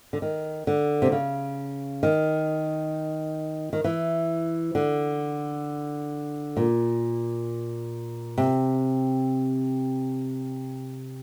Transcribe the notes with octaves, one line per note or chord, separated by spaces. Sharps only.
D3
D#3
D3
C3
C#3
D#3
D#3
E3
D3
A#2
C3